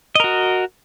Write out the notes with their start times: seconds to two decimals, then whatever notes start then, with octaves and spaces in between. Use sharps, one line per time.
0.15 D#5
0.20 A#4
0.24 F#4